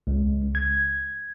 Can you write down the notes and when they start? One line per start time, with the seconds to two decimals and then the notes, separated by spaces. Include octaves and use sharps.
0.07 C#2
0.55 G#6